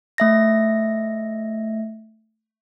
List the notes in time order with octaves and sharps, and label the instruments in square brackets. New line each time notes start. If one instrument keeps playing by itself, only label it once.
[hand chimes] A3 E5 A#6